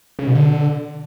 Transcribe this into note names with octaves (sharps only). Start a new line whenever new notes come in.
C#3
B2
D3